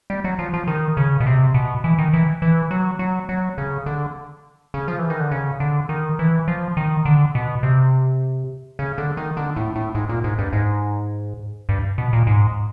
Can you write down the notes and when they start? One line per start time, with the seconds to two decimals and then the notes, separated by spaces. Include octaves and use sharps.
0.10 G3
0.24 F#3
0.39 F3
0.54 F3
0.68 D#3
0.97 C#3
1.20 B2
1.26 C3
1.54 B2
1.84 E3
1.99 D#3
2.13 E3
2.42 E3
2.71 F#3
2.99 F#3
3.29 F#3
3.58 C#3
3.86 D3
4.74 C#3
4.88 F3
4.99 E3
5.10 D#3
5.20 D3
5.31 C#3
5.60 D3
5.89 D#3
6.19 E3
6.48 F3
6.77 D#3
7.05 D3
7.35 B2
7.63 C3
8.79 C#3
8.98 D3
9.17 D#3
9.37 D3
9.56 A2
9.76 A2
9.95 G#2
10.09 A#2
10.24 G#2
10.39 G2
10.53 G#2
11.69 G2
11.98 B2
12.13 A#2
12.27 G#2